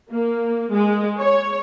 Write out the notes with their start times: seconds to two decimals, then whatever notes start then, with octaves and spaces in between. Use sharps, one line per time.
0.11 A#3
0.73 G#3
1.19 C#5